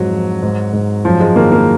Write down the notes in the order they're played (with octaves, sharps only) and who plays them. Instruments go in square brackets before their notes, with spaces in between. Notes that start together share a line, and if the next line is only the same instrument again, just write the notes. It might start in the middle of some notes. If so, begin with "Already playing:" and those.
Already playing: [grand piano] F2 G#2 F#3
F3
G#2
G#2
F#2 F3
G#3
D#3 A#3
A#3